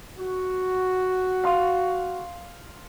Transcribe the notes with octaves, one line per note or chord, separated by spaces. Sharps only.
F#4
F5 C6